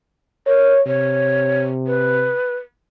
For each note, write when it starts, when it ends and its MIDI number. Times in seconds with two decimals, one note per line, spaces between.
0.47 0.74 70
0.47 0.81 73
0.87 2.34 48
0.87 1.62 73
1.87 2.56 71